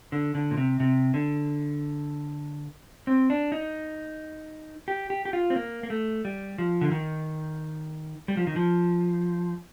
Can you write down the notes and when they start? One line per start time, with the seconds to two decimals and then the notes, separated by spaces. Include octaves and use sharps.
0.12 D3
0.35 D3
0.51 A#2
0.57 C3
0.80 C3
1.14 D3
3.07 C4
3.30 D4
3.52 D#4
4.88 G4
5.10 G4
5.25 G4
5.33 F4
5.50 C4
5.56 A#3
5.83 A#3
5.90 A3
6.25 G3
6.58 F3
6.81 D3
6.92 D#3
8.28 G3
8.37 F3
8.47 D#3
8.56 F3